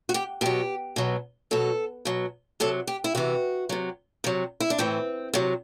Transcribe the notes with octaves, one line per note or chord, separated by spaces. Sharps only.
F#4
G4
B2 F#3 G4
B2 F#3
B2 F#3 A4
B2 F#3
C3 F#3 A4
G4
E4
C3 E3 F#4
C3 F#3
C3 F#3
E4
D4
A2 E3 C4
C3 F#3